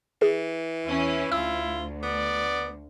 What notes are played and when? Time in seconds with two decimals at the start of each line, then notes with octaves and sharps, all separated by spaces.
0.22 E3 G#4
0.85 E2 C#4 E4
1.32 D2 F4 E6
2.03 B3 D5